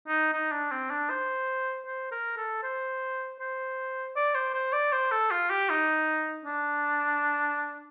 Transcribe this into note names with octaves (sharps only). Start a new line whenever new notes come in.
D#4
D#4
D4
C4
D4
C5
C5
A#4
A4
C5
C5
D5
C5
C5
D5
C5
A4
F4
G4
D#4
D4